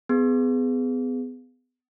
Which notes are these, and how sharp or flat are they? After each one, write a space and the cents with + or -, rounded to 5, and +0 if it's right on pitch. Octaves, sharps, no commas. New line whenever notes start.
B3 +30 G#4 +0